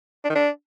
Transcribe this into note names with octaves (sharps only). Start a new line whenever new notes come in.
D4
D#3
D4